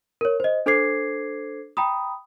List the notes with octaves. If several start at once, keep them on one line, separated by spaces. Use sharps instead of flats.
A#4 C#5
C5 D#5
D4 A4 C5 D6 G#6 C7
G5 A#5 B5 D#6